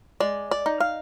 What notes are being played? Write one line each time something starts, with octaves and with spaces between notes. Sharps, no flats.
G#3 D5
D5
D#4
F5